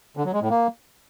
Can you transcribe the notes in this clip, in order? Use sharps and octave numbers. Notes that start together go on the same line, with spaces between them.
D3
F#3
G#3
A2
A#3